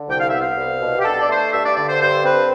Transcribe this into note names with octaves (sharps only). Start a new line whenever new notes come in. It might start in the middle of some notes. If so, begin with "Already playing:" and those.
Already playing: D3
C2 G5
F5
B3 E5
F5
C2
B2
G4
D4 A4
D5
A3 C5
G2 E5
D5
D3 D5
C5
G2 C5
C4 B4